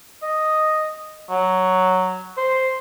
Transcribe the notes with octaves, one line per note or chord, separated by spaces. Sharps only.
D#5
F#3
C5